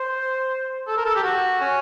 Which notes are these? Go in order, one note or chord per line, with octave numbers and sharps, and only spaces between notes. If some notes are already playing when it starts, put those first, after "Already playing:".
Already playing: C5
A4
A#4
A4
G4
F#4
C#4